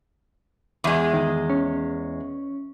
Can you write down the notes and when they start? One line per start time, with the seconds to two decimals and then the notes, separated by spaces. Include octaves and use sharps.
0.84 E2 G#3
1.13 D#3
1.50 C#4